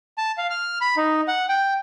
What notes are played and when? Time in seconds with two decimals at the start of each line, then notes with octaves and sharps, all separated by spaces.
0.18 A5
0.38 F5
0.50 F6
0.81 B5
0.97 D#4
1.28 F#5
1.49 G5